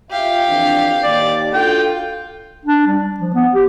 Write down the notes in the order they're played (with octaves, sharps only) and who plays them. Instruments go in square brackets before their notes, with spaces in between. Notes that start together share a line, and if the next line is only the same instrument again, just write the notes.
[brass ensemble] F4 E5 [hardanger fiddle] G4 F5
[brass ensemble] F2 E3 D4
[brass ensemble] D#2 [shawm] D5
[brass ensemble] D4 F#4 A4 [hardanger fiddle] F4 [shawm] G5
[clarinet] D4
G3
F3
B3
G4